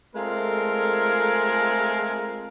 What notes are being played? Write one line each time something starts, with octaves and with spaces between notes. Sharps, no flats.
G#3 A3 C4 F4 A4 A#4